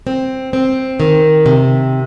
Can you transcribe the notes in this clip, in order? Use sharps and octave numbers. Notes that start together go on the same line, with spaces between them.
C4
C4
D#3
C3